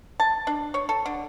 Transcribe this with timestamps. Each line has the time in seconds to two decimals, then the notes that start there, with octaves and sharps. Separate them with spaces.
0.20 A5
0.47 D4
0.74 C#5
0.89 A4
1.06 D3